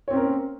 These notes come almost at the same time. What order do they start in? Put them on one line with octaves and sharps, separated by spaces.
C#5 C4 C#4 A#4 A#3